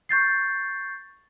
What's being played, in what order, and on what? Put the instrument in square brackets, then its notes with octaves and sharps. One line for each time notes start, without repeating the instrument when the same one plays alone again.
[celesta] C#6 G6 A6 C7